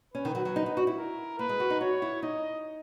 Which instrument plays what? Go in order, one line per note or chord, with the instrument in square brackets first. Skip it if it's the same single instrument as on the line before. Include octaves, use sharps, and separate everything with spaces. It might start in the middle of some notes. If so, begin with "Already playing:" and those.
[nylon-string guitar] C#4 [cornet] B4
[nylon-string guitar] D#3
F#3
F#3
D#4
D#4
F#4
E4
[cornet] A#4
[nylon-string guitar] A#3 [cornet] B4
[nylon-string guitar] G#3
F#4
D#4
[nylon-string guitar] F#4 [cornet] C#5
[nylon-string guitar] E4
[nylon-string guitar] D#4 [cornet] D#5